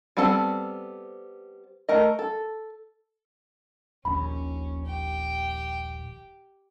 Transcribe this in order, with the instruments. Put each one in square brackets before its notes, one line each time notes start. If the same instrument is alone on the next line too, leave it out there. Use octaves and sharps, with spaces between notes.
[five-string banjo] G3 B3 C4 A4 A5
A3 A#4 D#5
A4
[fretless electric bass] D#1 A#1 D#2 [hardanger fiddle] C#4 [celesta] B5
[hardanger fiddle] G4 G5